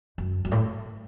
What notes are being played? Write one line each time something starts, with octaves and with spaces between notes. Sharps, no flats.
F#2
F#2
A2